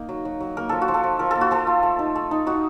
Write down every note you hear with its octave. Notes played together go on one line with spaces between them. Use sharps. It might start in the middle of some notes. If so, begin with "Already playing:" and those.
Already playing: A#3 D#4
F#3
F#3
F#3
A#3 A#4
F3 A4
F#4
F3
A4
F3
F3 A#4
A#3 A4
F#4
F3 A4
F4
A3
D#4
A3
D#4
D#4 F#4